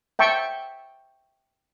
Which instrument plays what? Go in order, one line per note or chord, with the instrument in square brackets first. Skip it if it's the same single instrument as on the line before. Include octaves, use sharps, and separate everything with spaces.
[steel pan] E5 G5 A5 C#6